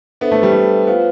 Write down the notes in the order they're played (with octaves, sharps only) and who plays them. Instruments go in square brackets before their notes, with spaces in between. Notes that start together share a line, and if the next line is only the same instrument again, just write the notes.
[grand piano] B3 [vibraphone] D4 A4 C5 E5
[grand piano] A3
G3
A3
[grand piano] B3 [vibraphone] F4 C5 F5